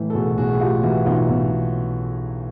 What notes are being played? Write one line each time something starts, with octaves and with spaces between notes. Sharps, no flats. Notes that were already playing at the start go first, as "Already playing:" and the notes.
Already playing: A2 E3
A4
B1 F#4 G#4
B1 F#4 G#4
G#4
A2 F4 G4
E3 E4 F#4
B1 D#4 F4
B1